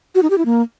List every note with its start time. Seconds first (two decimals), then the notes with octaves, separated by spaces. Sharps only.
0.15 F#4
0.23 D#4
0.30 G4
0.38 E4
0.45 A#3